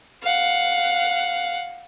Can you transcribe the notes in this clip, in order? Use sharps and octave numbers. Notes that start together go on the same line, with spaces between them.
F5 F#5